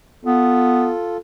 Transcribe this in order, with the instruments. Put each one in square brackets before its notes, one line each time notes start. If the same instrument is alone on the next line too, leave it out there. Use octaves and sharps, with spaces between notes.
[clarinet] B3 [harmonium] F4 A4